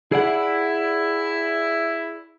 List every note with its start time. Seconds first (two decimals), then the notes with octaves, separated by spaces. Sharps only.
0.12 E4 G#4 D5 F#5